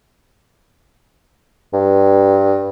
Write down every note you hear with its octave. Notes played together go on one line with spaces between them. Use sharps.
G2